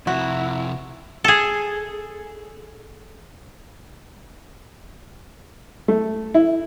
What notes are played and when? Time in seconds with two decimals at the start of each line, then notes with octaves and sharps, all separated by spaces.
0.07 F2 C3 E4 F#4
1.24 G#4 A4
5.88 A3
6.34 E4